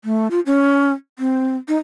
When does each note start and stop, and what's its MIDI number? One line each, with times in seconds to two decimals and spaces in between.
0.05 0.28 57
0.31 0.40 65
0.46 0.92 61
1.19 1.57 60
1.68 1.76 63